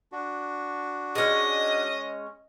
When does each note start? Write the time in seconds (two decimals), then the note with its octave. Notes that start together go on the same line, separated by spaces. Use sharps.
0.12 D4 F#4
1.15 G#3 C#4 D#5